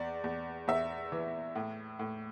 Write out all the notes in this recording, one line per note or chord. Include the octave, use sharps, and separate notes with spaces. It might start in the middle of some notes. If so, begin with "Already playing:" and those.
Already playing: E2 D5
E2
E2 E5
E3
A2
A2